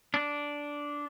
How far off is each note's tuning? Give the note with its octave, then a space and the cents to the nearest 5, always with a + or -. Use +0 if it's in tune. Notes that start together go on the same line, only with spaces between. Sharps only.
D4 -10